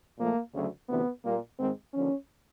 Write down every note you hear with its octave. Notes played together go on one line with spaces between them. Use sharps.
A#2 F3 A3 A#3
D2 C#3 F#3 A3
D2 C3 E3 B3
A#2 G3 A#3
G#2 D#3 G#3 C4
D#2 D3 F3 C#4